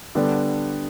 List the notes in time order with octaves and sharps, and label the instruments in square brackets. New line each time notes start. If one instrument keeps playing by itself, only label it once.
[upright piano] D3 G3 B3 D4